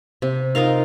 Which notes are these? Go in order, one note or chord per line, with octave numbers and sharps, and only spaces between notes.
C3
D#4 F4 A#4 F5